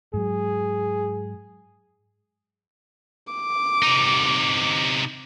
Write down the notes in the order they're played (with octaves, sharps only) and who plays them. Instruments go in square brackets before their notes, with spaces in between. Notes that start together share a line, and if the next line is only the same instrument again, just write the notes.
[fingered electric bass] G#2 F#3 [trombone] G#4
[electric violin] D6
[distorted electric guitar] C3 D#4